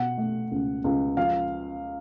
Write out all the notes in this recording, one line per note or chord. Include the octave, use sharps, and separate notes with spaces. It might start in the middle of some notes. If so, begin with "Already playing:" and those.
Already playing: B2 F#5
A3
C#2
C#2
F3 F5